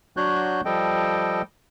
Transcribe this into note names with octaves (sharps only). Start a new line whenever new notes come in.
F#3 D4 F#4 C#5 F#6 G6
F3 G3 A4 D#5 G5